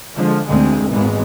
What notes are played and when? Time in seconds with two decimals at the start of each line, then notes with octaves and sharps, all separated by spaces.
0.15 D3 F3 G#3
0.48 F1 D2 D3 G#3 A3 C4
0.88 G#1 D#2 A#2 E3 G#3 B3